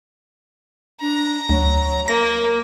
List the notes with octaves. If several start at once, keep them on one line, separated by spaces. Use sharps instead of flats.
D4 A#5
D2 F#3
A#3 A#4 A#6